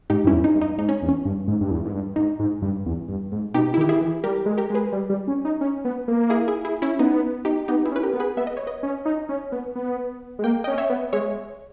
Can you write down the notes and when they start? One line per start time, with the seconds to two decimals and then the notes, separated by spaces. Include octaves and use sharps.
0.10 G#2 D#4 G4
0.24 G2 C#4 E4
0.32 E2
0.44 D#4
0.55 G2
0.62 D#4
0.78 G#2 D#4
0.89 C#4
1.02 E2
1.09 C#4
1.25 G2
1.48 G#2
1.61 G2
1.71 E2
1.85 G#2
1.93 G2
2.16 G#2 D#4
2.39 G#2
2.62 G2
2.86 E2
3.08 G2
3.32 G#2
3.54 B2 D#4 G4
3.74 E4
3.78 D#3
3.81 G4
3.89 E4 G#4
4.01 E3
4.24 G3 G4 A#4
4.46 G#3
4.58 G4 A#4
4.70 G#3
4.75 G#4 B4
4.92 G3
5.10 G3
5.27 C#4
5.45 D#4
5.61 C#4
5.85 B3
6.08 A#3
6.30 E4 G#4
6.48 E4 G#4
6.65 E4 G#4
6.82 C#4 E4
6.99 B3 D#4
7.45 D#4 G4
7.68 B3 D#4 G4
7.86 E4 G#4
7.92 C#4
7.96 B4
8.03 G4 A#4
8.14 B3
8.20 G#4 B4
8.37 B3 E5
8.47 D#5
8.57 C#5
8.67 B4 D#5
8.83 C#4
9.05 D#4
9.29 C#4
9.52 B3
9.75 B3
10.39 G#3
10.44 A#3 G5
10.64 C#4 D#5 G5
10.78 C#5 E5
10.90 B3
11.13 G#3 C#5 E5